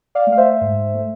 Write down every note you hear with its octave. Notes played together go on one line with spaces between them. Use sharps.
D5 F5
A3
F5
C5 E5
G#2
A3